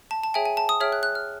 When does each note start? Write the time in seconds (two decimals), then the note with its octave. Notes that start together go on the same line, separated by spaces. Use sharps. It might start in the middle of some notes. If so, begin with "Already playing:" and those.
0.11 A5
0.24 A5
0.34 G#4 C#5 E5 G5 G#5
0.46 G#5
0.57 A5
0.69 D#6
0.80 G#4 C#5 E5 G5 F6
0.92 F#6
1.03 F#6
1.15 F6